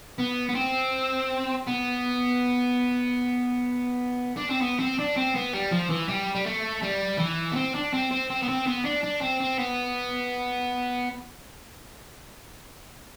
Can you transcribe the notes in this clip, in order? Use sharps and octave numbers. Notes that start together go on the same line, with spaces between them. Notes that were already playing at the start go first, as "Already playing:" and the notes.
B3
B3
C4
B3
D4
C4
B3
C4
D4
C4
B3
G3
F3
E3
G3
G3
A3
G3
E3
B3
C4
D4
C4
C4
C4
B3
C4
B3
D4
D4
C4
C4
B3